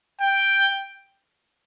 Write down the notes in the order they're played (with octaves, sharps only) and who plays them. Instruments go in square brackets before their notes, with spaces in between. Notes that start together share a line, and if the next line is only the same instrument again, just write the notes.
[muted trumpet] G5